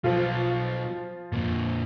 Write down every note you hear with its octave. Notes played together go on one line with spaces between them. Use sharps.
B2 F3 F#3 F4
F2 A#2